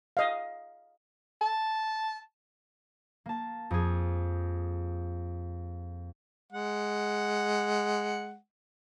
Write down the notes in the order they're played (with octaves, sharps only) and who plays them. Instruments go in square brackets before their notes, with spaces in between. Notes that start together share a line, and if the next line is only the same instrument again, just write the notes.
[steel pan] D#5 F5
[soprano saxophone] A5
[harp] A#3 A5
F2 G#4
[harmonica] G#3 F#5